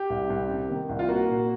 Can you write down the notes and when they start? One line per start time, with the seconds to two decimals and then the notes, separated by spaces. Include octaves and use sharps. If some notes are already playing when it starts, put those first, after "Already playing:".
Already playing: G4
0.10 C2
0.30 C2
0.49 C3
0.69 D#3
0.89 C2
0.99 F4
1.08 A#3 F#4
1.28 A#2